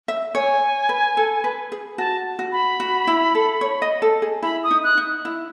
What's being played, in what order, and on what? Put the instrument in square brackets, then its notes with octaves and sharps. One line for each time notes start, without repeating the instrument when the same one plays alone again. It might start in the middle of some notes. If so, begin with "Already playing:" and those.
[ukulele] E5
[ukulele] C#5 [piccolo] G#5
[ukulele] B4
A4
B4
G#4
[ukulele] F#4 [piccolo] A5
[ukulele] F#4
[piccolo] B5
[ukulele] F#4
E4
A4
C#5
D#5
A4
G#4
[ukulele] E4 [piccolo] B5
[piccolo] D#6
[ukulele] D#4
[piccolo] F#6
[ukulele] D#4
E4